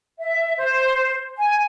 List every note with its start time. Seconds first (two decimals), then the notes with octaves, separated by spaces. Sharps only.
0.20 E5
0.58 C5
1.37 G#5